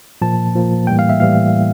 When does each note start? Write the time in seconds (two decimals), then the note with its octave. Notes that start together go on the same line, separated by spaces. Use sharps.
0.22 A#2 F3 A#3 A5
0.55 A#2 F3 A#3
0.87 A2 E3 G3 A#3 G5
0.99 F5
1.09 E5
1.20 A2 E3 G3 F5